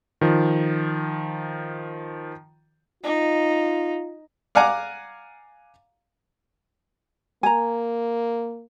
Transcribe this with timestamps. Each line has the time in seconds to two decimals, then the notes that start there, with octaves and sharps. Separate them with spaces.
0.21 D#3 F3
3.04 D#4 F4
4.55 D5 F5 F#5 G#5 A#5 D6
7.43 A#3 G#5 A#5